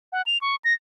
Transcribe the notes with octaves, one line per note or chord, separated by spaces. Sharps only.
F#5
F7
C#6
A#6